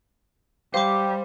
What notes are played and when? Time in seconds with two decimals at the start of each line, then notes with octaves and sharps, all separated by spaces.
0.74 G3 G4 C5 F5 D6